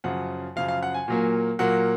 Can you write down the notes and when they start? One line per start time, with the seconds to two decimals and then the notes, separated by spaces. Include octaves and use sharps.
0.04 F#2 C#3 F3 F#5
0.56 F#2 C#3 F3 F5
0.68 F5
0.83 F#5
0.94 G#5
1.08 A#2 F#3 A#3
1.59 A#2 F#3 A#3 F#5